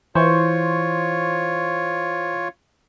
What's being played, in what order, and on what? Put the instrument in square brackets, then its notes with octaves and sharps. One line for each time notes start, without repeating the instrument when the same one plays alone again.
[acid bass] E3 [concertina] F4 C#5 [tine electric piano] C5 C#6